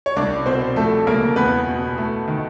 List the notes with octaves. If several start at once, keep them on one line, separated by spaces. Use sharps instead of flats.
C#5
C2 D4 D5
B2 C4 C5
F2 A3 A4
C#3 A#3 A#4
E2 B3 B4
B2
A3
D#3